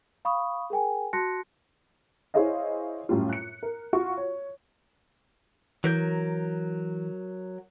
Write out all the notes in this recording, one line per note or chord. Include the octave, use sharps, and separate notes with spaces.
F5 B5 C#6 D#6
G#4 A#4 G5 G#5
F#4 A5 C6 F#6 A#6 C#7
E4 G#4 C5 C#5 D#5 F5
F#2 A2 G3 F4
F#6 C#7
A#4
F4 F#4 C#6
C#5
E3 F#3 A#4 G6